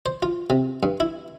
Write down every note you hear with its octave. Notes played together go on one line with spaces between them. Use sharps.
C5
F4
C3
G2
E4